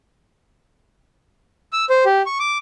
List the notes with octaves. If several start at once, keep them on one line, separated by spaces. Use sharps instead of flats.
E6
C5
G4
C#6
D6